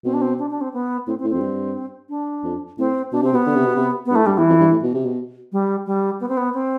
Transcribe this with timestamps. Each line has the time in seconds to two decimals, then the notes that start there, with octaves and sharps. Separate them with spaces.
0.04 B2 C4
0.13 D4
0.21 C4
0.39 D4
0.50 D4
0.61 C4
0.73 B3
1.07 A2 C4
1.19 C4
1.24 A2
1.30 F2 C4
1.41 G2
2.09 D4
2.44 F2
2.78 A2 C4
3.12 B2 D4
3.22 C3 C4
3.33 B2 B3
3.47 D3
3.56 C3
3.67 B2
3.76 C3
4.05 B3
4.10 G2
4.15 A2 A3
4.26 G2 G3
4.37 E2 E3
4.49 F2
4.60 G2
4.71 A2
4.83 B2
4.94 C3
5.05 B2
5.52 G3
5.86 G3
6.20 B3
6.28 C4
6.37 B3
6.54 C4